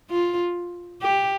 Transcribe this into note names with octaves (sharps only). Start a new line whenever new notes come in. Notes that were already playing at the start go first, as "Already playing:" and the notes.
F4
G4